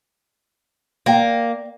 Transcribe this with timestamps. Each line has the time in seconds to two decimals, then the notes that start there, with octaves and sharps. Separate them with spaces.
1.06 A#3 D5 G5